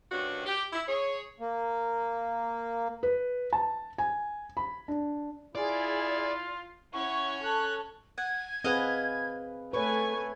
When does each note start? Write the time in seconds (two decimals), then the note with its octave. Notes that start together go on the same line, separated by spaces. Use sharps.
0.12 D2 G2 D#3 C#4 D4 F#4
0.46 G4
0.73 E4
0.88 G#4 C#5
1.40 A#3
3.03 B4
3.53 A5
3.98 G#5
4.57 B5
4.88 D4
5.55 E4 F4 G#4 D5
6.93 C#4 E4 C#5 F#5 C#6
7.43 A4 A5 F#6
8.18 F#5 G#6
8.64 C4 G#4 B4 D#5 F5 F#5
9.73 A3 B4 C#5 G#5 C#6